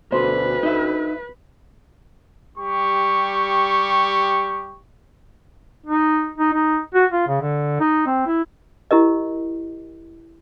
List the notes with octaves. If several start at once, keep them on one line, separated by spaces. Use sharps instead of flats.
D2 B2 D3 B4 C5
D#4 E5
G3 G4 C#6
D#4
D#4
D#4
F#4
F4
C#3
D3
D#4
C4
E4
E4 G4 A#4 D#5